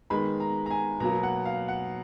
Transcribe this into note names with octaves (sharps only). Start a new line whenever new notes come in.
D#3 G#3 B3 B5
A#5
A#5
G#5
B2 F#3 A#3 A#5
F#5
F5
F#5